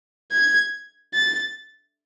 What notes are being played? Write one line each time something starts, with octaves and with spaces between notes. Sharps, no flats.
G#6
A6